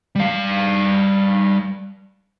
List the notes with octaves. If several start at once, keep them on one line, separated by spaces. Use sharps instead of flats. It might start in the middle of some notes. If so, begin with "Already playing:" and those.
G3 F5